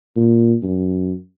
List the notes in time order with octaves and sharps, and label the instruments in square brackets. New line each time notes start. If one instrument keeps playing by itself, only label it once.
[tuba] A#2
F#2